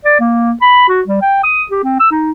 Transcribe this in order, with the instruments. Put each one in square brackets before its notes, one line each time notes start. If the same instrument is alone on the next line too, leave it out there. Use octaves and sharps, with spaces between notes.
[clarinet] D5
A#3
B5
F#4
G3
G5
D#6
G4
C4
E6
D#4